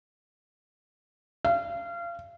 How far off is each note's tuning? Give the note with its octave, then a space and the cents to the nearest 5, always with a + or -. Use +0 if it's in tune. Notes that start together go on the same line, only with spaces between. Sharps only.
F5 -30